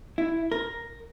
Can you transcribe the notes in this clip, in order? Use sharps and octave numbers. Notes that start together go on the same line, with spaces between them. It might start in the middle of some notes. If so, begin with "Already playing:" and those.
E4
A#4